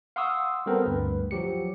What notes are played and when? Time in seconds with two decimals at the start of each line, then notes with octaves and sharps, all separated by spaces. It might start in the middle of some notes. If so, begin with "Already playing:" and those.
0.16 F5 F#5 C6 C#6 D#6 E6
0.66 G3 B3 C4 A4 A#4 C5
0.85 D2 G2 B4
1.31 F3 F#3 G4 C#7